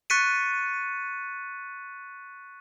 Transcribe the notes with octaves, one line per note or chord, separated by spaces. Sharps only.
C#6 F#6 A6 B6 C#7 D#7